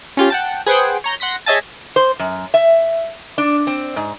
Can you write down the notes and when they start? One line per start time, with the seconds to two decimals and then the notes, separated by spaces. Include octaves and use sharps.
0.17 C#4 F4 G4
0.30 F#5 G5 A5
0.66 G#4 B4 C5 F#5 G5
1.04 C#5 A#5 G6
1.20 F#5 C6 A#6 B6
1.46 G#4 C#5 D#5 E5 G#5 A5
1.96 C5
2.19 F#2
2.54 E5
3.38 D4
3.67 C4
3.96 G#2